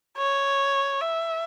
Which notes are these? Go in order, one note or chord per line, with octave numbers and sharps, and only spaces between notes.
C#5
E5